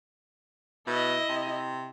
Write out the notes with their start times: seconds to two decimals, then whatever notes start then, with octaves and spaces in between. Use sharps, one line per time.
0.87 B2 E4 D#5
1.29 C3